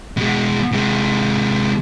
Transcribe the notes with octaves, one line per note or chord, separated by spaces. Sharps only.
B2 G#3
C3 G#3